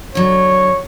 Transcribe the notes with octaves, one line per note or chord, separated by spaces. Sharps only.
D3 F#3 C#5